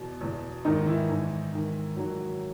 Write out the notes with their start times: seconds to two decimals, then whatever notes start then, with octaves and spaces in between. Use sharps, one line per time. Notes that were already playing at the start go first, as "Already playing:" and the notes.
Already playing: E2 B2
0.21 E2 B2
0.65 G#2 D#3 D#4
0.86 E3 E4
1.09 G#2 D#3
1.52 G#2 D#3
1.96 G#2 D#3 F#3 F#4